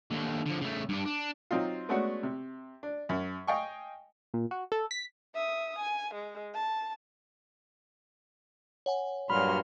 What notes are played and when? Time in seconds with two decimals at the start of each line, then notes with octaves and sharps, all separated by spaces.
0.10 D#2 D3
0.46 D3 F3
0.61 C#3 A3
0.89 G2 D4
1.06 D4
1.51 F#3 C4 D#4 F4
1.89 G#3 A3 B3 C#4 D4 F#4
2.23 C3
2.83 D4
3.09 F#2
3.47 D#5 F5 G5 G#5 C#6
4.34 A#2
4.51 F#4
4.72 A4
4.91 B6
5.34 E5 D#6
5.79 G#5
6.15 G#3
6.54 A5
8.86 C#5 F#5 G#5
9.30 G2 A#2 F#3 B5 C6 F6